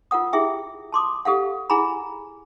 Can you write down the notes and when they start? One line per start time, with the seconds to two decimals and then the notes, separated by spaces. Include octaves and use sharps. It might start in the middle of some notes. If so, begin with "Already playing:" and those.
0.11 F4 A#4 F#5 D#6
0.33 E4 G4 G#4 E5 G5
0.92 A5 C6 D6 D#6
1.25 G4 A4 F5 F#5
1.70 E4 G#4 F#5 G#5 A#5 B5